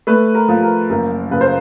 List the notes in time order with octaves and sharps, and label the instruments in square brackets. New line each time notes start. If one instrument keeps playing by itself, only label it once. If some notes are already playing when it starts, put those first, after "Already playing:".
[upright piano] A3 B4
A#4
F3
A#4
F#1 A#4
C#3 B4
C5